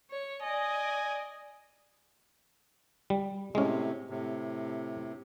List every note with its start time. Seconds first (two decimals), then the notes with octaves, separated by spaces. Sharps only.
0.11 C#5
0.43 D5 D#5 G#5
3.10 G3
3.55 A2 C3 G#3 C#4
4.10 A2 C3